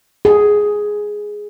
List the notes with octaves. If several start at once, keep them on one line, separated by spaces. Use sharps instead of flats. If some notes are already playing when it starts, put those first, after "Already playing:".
G#4